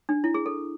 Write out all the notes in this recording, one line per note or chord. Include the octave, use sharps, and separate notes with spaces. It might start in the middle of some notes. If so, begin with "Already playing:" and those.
D4
E4
G#4
A4